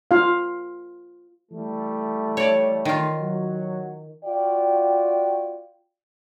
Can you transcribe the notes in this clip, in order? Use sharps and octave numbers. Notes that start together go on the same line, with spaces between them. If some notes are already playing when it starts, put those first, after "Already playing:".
F4 F5
E3 G3 A3
C#5 D5
D#3 F4
F#3 F#4
F4 F#4 D5 G5